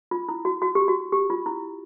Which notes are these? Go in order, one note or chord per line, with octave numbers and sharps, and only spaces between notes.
F4
E4
F#4
F#4
G4
F#4
G4
F4
E4